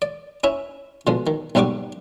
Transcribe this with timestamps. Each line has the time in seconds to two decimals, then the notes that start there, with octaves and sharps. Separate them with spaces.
0.02 D5
0.44 C#4 E4 E5
1.07 B2 D3 F3 G#3
1.27 D#3
1.55 B1 G#2 G3 F#5 C#6 D6